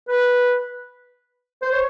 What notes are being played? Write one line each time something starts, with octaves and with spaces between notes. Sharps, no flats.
B4
C5
C#5